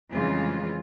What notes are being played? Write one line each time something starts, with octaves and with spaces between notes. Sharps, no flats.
F2 C#3 E3 G3 G#3 F4